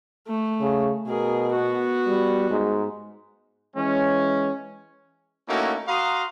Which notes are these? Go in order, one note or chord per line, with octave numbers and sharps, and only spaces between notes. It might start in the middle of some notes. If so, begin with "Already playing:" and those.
A3
C#3
B2 G#4 A#4
B3 F#4
G3
G#2
E3 G#3 C#4
A3 A#3 C#4 D#4 E4 F#4
F#4 F5 A#5 C6 D#6